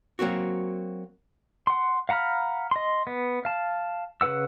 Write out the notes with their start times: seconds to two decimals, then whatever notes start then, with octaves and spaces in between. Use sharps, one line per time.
0.19 F#3 A#3 C4 F#4
1.67 F#5 C6
2.09 F5 F#5 A#5 B5 F6
2.71 D#5 C6
3.07 B3
3.45 F5 A5
4.21 C#3 F4 B4 F#5 E6